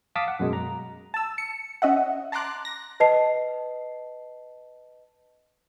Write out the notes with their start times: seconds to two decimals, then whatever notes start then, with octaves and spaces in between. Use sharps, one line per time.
0.15 F5 A5 D6 D#6 B6
0.28 F#5
0.40 F#2 B2 G#3
0.53 A#5
1.14 A5 E6
1.38 C#7
1.82 C#4 D#5 E5 F#5
2.32 A5 A#5 C6 D6 F#6
2.65 A#6
3.00 B4 D#5 A5 C7